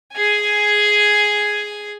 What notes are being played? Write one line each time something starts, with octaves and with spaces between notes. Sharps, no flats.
G#4 G#5